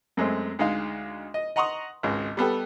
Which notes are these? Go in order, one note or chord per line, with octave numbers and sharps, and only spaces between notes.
F#2 G#3 A3 C4
D2 G#3 D#4 F5
D#5
D#5 F#5 A#5 C6 C#6 D#6
G#1 C#2 G#3
G3 B3 A4 G5